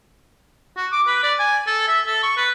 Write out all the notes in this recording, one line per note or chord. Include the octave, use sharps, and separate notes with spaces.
F#4
D6
B4
D5
G#5
A4
E5
A4
C#6
B4